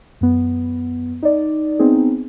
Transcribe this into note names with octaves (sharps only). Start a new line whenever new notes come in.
F#2 B3
D#4 D5
B3 C4 D#4 G#4